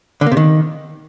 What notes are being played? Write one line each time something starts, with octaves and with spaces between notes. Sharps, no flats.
D3
A#3
C3
D#3